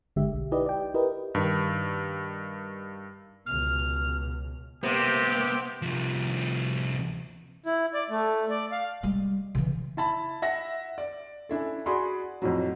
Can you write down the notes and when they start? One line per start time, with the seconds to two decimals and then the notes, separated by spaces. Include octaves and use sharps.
0.16 G1 D3 G#3 G4 E5
0.34 B1
0.52 D#4 E4 G4 B4 D5 D#5
0.66 D5 G5
0.94 E4 G4 A#4 B4 D#5
1.35 G2 D#3
3.46 C#2 B2 F6
4.83 C3 A#3 B3 G4
5.82 C2 F3
7.66 E4
7.94 D5
8.10 A3
8.50 D5
8.72 F5
9.03 G3 G#3
9.55 C#3 E3
9.97 E4 A5 B5
10.42 E5 F#5 A#6
10.98 D5
11.49 C#4 D4 E4 A4
11.86 F#4 G#4 D5 B5 C6
12.42 F2 A2 F#3